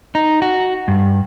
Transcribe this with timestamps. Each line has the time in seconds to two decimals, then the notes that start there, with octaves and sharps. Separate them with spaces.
0.15 D#4
0.42 F#4
0.88 G2